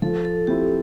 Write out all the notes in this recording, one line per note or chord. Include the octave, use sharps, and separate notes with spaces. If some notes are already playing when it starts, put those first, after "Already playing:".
F3 A4
A4
C4 E4 G4